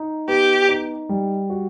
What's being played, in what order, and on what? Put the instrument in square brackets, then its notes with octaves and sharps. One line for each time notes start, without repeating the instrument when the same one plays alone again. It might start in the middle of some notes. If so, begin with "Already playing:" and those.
Already playing: [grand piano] D#4
[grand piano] B3 [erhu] G4
[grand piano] D#4
G3
F#4